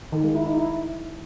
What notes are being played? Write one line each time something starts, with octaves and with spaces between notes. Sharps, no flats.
D#3
G#3
E4
D#4
E4